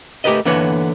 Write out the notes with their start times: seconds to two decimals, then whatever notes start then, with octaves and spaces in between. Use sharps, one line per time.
0.24 A3 G4 A#4 B4 D#5
0.46 D3 E3 A#3 B3 B4 C#5